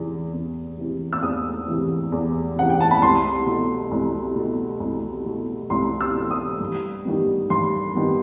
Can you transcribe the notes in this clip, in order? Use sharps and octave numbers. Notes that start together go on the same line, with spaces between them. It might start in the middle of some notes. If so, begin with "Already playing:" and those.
Already playing: E2 C3 E3
E2
C3 E3
E6
E2 D#6
C3 E3
E2
C3 E3 F#5
G5
A5
B5
C2 C6
B2 A3
C2
B2 A3
C2
B2 A3
C2 C6
E6
B2 A3
D#6
G2
D#3 G3 B3
G2 C6
D#3 G3 B3